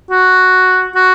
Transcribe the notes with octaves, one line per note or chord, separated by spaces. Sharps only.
F#4
F#4